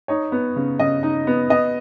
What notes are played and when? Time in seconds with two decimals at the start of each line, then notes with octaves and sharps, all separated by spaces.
0.08 D#4 C#5
0.32 B3
0.56 C#3
0.79 C#3 D#5
1.03 D#4
1.27 B3
1.50 B3 D#5